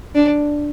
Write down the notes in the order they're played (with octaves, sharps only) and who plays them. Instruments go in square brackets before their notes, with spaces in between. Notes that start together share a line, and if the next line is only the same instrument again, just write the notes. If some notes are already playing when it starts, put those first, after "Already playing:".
[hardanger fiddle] D4